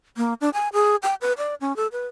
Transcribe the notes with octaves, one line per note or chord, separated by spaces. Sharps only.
A#3
D4
G#5
G#4
G5
B4
D5
C#4
A4
B4